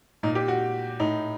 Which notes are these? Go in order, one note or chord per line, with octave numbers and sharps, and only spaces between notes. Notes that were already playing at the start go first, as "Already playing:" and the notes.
A#2 D#4
G4
F#4
A2 D#4